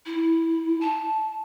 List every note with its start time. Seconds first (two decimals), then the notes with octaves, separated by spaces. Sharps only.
0.06 E4
0.81 A5